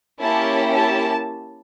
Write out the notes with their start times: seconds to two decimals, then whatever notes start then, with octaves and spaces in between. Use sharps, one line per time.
0.19 A#3 C#4 E4 G4 A5
0.74 A5